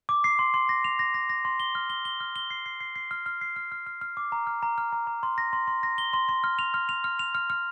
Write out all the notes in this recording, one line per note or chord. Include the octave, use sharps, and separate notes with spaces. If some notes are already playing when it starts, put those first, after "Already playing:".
D6
C7
C6
C6
A#6
F7
A#6
A#6
A#6
C6
G7
F6
G7
G7
F6
G7
C7
C7
C7
C7
F6
F6
C7
F6
F6
F6
F6
D6
A#5
F6
A#5
F6
A#5
A#5
C6
A#6
C6
C6
A#6
G7
C6
C6
F6
F7
F6
F7
F6
F7
F6
F6